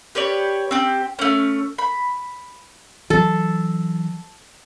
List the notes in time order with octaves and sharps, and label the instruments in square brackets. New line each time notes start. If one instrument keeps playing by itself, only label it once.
[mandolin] G4 B4 C#5 D5
C4 G4
A3 C#4
B5
[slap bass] E3 F#3 [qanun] A4